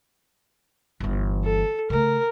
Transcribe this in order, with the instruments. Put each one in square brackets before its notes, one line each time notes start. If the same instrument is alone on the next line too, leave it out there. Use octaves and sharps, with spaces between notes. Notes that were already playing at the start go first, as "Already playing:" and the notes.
[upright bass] G1 E3
[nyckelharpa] A4
[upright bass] C#3 A3 [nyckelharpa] A#4